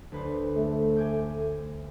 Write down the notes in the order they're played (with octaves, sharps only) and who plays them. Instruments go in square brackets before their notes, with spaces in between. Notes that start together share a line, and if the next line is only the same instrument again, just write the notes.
[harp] D2 B4 C5
[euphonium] A3
[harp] G#5 D6 G6